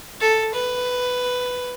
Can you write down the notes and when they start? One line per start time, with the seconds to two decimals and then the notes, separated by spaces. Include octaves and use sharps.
0.21 A4
0.54 B4